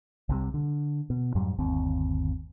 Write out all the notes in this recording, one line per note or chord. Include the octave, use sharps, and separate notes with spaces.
C2 C3 G3
D3
B2
F2 G#2 F#3 G3
G1 D#2 C4